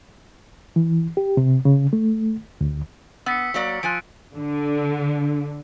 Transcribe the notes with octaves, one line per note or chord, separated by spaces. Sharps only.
E3
G4
C3
C#3
A3
D2
B3 E6 B6 C#7
F#3 A#3 D5
F3 F4 G#5 F#6 D7
D3